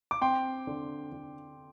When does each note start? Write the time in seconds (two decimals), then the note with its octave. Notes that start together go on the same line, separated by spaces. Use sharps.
0.11 D6
0.22 C4 G5 C6
0.67 D3
1.12 D3